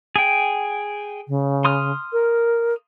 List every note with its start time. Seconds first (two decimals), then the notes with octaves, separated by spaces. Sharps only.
0.16 G#4 G5
1.28 C#3
1.65 C6 D#6 F6
2.13 A#4